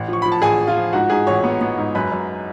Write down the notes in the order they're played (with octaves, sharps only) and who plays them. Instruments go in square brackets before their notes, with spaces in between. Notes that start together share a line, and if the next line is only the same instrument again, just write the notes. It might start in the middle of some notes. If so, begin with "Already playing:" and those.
Already playing: [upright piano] A1
[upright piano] F3 [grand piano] C#6
[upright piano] F3 [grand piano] B5
[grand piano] A5
[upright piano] A1 [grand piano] G#4 G#5
[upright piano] A1
[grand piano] F4 F5
[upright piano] F3
[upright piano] G#2 [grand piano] F#4 F#5
[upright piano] G#2 [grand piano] G#4 G#5
[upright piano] A1 [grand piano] C#5 C#6
[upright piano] B3
B3
G#2
[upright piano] F#2 [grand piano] B4 B5
[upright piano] F#2